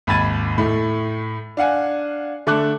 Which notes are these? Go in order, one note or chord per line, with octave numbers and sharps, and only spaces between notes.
G#1 D#2 B5 G#6 A6 D#7
A2 A3
D4 F5 F#5 G#5
D3 A3 A5 D6 F#6